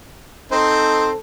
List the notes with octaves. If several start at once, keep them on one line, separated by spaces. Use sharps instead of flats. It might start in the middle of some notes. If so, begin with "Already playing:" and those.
C4 D#4 A4 C5